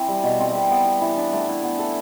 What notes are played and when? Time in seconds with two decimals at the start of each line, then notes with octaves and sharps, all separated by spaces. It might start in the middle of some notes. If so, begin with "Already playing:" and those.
Already playing: E3 C4 E4
0.08 G3
0.23 B2
0.39 C4
0.55 B4
0.70 B3
0.86 B4
1.01 E3
1.17 D4
1.33 A3
1.48 E4
1.63 B3
1.79 A4